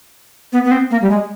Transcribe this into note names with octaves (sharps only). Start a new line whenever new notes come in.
B3
B3
C4
A#3
G3
G#3